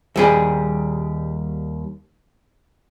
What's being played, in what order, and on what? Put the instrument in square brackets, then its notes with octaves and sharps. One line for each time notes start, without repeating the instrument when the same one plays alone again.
[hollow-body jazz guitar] D#2 G3 G#4